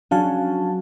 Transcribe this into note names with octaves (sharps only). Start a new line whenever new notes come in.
F#3 C#4 D4 F#4 F5 A5